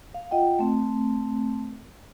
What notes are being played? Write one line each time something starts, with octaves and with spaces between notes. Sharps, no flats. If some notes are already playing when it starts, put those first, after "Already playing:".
F5
F4 D#5 F#5 G5
A3 C4